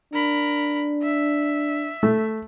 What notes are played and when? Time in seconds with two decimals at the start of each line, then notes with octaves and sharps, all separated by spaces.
0.14 D4 A#4 B5
1.03 E5
2.03 A3